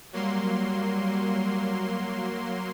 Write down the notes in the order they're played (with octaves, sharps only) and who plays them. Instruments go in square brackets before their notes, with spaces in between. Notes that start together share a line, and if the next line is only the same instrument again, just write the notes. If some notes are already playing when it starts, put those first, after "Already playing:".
[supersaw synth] F#3 A#3 C6 [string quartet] G3